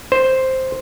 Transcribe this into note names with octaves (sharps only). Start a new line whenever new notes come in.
C5